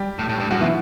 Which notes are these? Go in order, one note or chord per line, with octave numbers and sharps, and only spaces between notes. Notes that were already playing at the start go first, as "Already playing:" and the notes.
Already playing: G3 G4
A2
A2
G2
F#2 F#3 F#4
B2 E3 E4